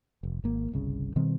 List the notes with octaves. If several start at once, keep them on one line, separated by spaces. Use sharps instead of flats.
F1
G#1 A#3
G1 C2 C#3
B2 D#3 G3 C4